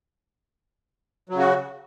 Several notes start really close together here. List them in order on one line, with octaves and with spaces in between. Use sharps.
F#3 C#3 F#4